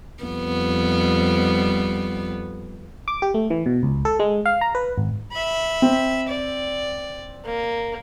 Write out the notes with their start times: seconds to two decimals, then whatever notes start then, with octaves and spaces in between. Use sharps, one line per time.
0.23 F2 G3 B3
3.08 D6
3.22 G4
3.34 A3
3.50 E3
3.66 B2
3.83 C#2
4.05 A4
4.19 G#3
4.45 F5
4.61 A#5
4.75 B4
4.98 G#1
5.32 E5 B5
5.82 C4
6.28 D5
7.44 A#3